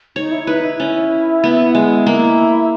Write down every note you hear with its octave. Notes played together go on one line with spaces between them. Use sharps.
D#4 C#5
E4
D#4 B4
E4
C#4
B3
G#3
A#3 E4